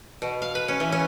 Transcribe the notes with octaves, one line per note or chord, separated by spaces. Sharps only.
B2
F5
B4
C#4
E3
C#4